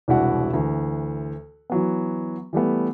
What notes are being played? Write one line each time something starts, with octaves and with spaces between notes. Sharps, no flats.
E1 C2 D4 E4 F#4 F#5
D2 E3
E3 F#3 B3
E3 G3 A3 B3